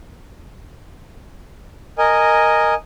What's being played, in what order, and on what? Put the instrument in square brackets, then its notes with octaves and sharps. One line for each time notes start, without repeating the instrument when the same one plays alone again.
[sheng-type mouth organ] A#4 D#5 G#5